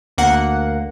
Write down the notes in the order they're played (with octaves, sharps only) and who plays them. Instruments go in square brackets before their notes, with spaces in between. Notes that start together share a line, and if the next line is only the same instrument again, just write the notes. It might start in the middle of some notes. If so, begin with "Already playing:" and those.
[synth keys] D2 A#3 F#5